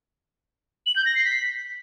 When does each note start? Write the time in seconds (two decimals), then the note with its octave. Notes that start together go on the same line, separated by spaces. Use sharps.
0.86 F#7
0.96 G6
1.05 A#6
1.15 C7
1.25 B6